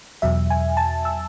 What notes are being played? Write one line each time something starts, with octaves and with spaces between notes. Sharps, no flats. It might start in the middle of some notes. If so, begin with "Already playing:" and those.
E2 B2 F#3 E5
G#5
A5
E6